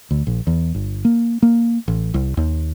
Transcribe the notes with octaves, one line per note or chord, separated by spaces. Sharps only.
D2
A#1
E2
G1
A#3
A#3
A1
C2
D#2